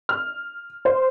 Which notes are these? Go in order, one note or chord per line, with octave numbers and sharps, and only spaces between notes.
F6
C5